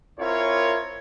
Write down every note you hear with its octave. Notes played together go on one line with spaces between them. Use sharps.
C4 E4 F4 A#4 C#5